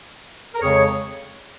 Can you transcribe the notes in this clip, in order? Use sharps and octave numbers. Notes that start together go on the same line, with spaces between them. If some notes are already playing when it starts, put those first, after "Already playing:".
A#4
F2 C#3 G#3 G#4 C#5